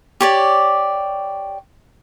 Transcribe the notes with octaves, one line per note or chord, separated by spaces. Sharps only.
G4 C#5 D5